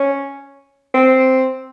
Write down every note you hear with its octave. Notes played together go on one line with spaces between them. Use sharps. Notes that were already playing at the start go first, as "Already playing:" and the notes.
Already playing: C#4
C4